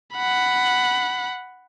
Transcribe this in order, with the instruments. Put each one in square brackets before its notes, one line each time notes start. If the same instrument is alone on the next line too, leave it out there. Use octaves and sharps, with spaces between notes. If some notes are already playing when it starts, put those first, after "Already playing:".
[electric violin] F#5 B5